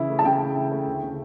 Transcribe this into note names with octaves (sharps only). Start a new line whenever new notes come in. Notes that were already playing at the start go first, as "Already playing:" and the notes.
Already playing: C#3 E3 E4
A3
A5
C#3 G5
E3
E4
A3
D2
C#3